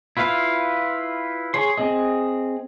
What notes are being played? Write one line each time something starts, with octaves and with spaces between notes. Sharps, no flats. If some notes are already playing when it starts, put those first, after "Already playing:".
E4 F4 B4 F5
G#4 C#5 C6
C4 G#4 D#5